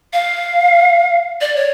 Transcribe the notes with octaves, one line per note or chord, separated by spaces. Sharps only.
F5
D5
C#5